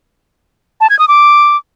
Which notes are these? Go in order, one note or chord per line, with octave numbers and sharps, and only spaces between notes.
A5
G#6
D#6
D6